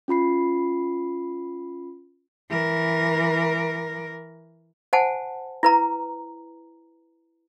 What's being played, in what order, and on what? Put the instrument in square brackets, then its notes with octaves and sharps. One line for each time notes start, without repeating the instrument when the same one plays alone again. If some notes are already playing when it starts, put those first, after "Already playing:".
[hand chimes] C#4 F4 B5 C7
[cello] E3 A#4
[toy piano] C5 F#5 G#5 A5
E4 B4 A#5